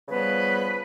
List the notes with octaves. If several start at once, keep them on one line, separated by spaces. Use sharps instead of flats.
C#3 F3 G3 B3 B4